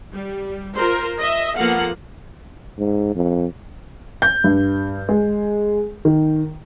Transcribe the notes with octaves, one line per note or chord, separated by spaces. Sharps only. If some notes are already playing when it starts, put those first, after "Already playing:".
G3
F4 A#4 C5
D#5 E5
F3 A#3 B3 A4 F5 F#5
G#2
F2
G6
G2
G#3
D#3